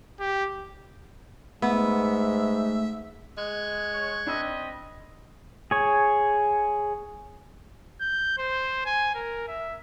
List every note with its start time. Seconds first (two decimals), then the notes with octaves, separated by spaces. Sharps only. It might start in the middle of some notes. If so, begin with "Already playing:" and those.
0.20 G4
1.62 G#2 A3 B3 E5
3.37 G#3 C#6 F#6 G#6
3.93 C#5
4.26 C4 D4 D#5 B5 E6
5.71 G#4 C#5
8.01 G6
8.38 C5
8.86 G#5
9.15 A#4
9.48 E5